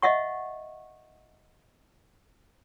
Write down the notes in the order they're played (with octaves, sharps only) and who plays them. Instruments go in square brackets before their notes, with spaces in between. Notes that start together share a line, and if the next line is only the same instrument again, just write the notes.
[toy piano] D#5 E5 F#5 C#6